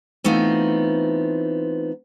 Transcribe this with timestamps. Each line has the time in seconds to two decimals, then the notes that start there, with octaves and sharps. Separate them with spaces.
0.24 E3 A3 B3 C4 D#4 F4